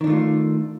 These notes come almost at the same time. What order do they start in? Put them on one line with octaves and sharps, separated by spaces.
D#3 D4 A3 F4